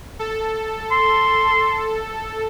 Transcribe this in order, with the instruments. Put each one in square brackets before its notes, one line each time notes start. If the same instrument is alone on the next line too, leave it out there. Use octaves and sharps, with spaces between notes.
[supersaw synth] A4
[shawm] C6